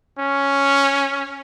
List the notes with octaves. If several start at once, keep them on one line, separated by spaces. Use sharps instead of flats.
C#4